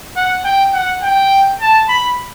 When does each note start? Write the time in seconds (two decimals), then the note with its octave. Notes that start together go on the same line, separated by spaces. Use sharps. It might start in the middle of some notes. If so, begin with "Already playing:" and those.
0.16 F#5
0.44 G5
0.74 F#5
1.03 G5
1.60 A5
1.89 B5